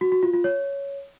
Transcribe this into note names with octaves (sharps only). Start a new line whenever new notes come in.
F#4
F#4
F4
F4
C#5